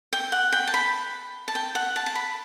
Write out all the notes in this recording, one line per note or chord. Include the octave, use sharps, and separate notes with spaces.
G5
F#5
G5
A5
B5
A5
G5
F#5
A5
A5
B5